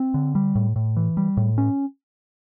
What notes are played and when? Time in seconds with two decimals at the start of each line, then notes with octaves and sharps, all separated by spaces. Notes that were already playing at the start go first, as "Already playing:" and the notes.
Already playing: C4
0.14 D3
0.35 G3
0.55 A2
0.76 A2
0.96 E3
1.17 G3
1.37 A2
1.58 C#4